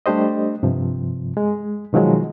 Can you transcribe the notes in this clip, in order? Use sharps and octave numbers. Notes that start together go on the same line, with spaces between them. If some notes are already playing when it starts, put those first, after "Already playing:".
G3 A3 D4 G4 C5 D#5
G2 C3 F3
G#3
B2 D#3 F3 F#3 G#3